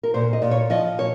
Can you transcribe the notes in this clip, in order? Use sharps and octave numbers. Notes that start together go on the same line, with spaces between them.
A#4
A#2 C5
D#5
A#2
C#5
F3 D#5
A#2 C#5